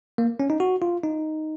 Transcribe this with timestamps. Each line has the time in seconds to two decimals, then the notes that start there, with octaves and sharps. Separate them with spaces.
0.18 A#3
0.40 C#4
0.50 D#4
0.60 F#4
0.82 F4
1.03 D#4